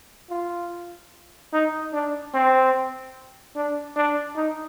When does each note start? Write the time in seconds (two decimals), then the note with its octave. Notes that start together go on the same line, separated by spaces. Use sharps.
0.30 F4
1.53 D#4
1.93 D4
2.34 C4
3.55 D4
3.96 D4
4.36 D#4